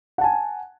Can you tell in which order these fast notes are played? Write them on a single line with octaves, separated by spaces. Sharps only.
F#5 A5 G#5